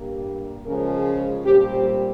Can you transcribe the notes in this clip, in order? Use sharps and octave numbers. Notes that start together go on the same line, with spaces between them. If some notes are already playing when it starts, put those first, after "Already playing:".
Already playing: G2 G3 A#3
C#3 F3 G#3 A#4
A#2 G3 C4 G4